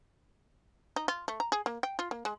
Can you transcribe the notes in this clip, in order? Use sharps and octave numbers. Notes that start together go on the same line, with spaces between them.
D#4
F4
A3
A#5
G#4
A#3
G5
F4
A#3
G#3